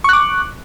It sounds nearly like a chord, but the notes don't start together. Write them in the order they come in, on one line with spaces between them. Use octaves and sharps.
C#6 F#6 D6